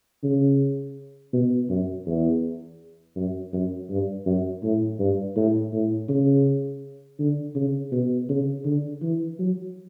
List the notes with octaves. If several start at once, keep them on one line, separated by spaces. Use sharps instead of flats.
C#3
B2
F#2
E2
F#2
F#2
G2
F#2
A2
G2
A2
A2
C#3
D3
C#3
B2
C#3
D3
E3
F#3